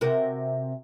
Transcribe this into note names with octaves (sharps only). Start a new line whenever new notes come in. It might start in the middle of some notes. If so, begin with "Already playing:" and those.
C3 F#4 A#4